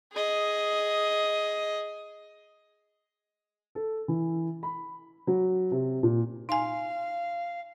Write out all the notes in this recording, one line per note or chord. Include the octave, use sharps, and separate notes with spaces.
G#4 D#5
A4
E3
B5
F#3
C3
A#2
D#4 F5 G#5